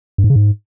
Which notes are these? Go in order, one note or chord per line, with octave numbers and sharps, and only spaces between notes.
G2
G#2
C#3
G#2